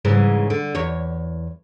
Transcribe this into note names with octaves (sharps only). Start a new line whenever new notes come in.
G#2 C#3 E3
D3
E2 C#5